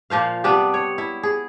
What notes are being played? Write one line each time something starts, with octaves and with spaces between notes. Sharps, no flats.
A#2 F3 C5 F5
C3 G3 B3 D4
C#5
E4
G#4